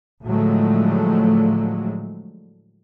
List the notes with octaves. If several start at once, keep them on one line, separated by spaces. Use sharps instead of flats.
A2 D3 F3 F#3 G#3 A3